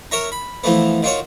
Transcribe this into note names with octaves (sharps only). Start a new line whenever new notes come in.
A#4 C#5 E5 A#5
B5
E3 F3 A3 B3
D#3 F4 F#4 C#5